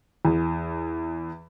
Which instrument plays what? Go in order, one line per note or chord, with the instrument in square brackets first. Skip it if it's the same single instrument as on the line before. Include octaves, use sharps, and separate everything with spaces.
[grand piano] E2